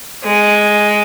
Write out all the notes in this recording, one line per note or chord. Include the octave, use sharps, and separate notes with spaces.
G#3